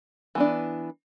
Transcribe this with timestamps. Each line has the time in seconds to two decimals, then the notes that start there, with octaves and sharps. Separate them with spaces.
0.35 E3 B3 D4